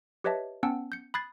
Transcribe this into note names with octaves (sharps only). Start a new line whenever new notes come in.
G4 B4 C#5 D#5 E5 A5
B3 C#4 F#5 G5 A5 E6
G6 C#7
B5 D#6 F#6 G#6 A6 C7